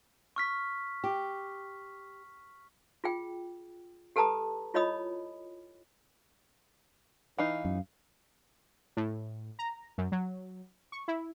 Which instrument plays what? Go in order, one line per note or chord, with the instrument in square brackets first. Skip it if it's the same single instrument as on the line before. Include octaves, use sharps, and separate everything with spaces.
[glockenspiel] C#6 F6 B6
[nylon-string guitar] G4
[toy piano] F4 G#4 G5
G4 A4 B4 A5 A#5 D#6
E4 F4 C#5 D#5 B5 D#6
[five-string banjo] E3 D#4 [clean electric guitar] F5
[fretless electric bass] F#2
[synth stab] A2
A#5
F#2
F#3
C#6
E4